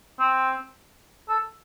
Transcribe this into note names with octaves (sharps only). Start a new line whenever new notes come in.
C4
A4